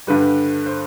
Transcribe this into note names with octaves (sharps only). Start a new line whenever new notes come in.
G2 D3 G3 B4
C5